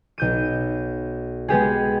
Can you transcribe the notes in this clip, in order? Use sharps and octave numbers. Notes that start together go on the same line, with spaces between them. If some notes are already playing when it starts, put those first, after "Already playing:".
B1 G6 D#7
G#3 B3 G4 G#4